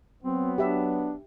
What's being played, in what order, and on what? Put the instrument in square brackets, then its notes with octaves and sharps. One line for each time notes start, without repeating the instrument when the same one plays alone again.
[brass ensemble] F#3 B3 [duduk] C4
[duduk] D4 [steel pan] G4 E5 B5